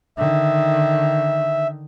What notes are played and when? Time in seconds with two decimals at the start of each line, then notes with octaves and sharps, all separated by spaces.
0.18 D3 D#3 E5